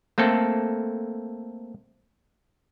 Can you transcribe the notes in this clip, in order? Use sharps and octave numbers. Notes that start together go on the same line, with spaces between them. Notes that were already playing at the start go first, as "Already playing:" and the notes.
A3 A#3 C4 A4